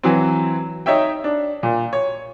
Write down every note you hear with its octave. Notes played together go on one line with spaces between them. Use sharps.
E3 F#3 C4
D#4 C#5 E5 G5
D4
A#2
C#5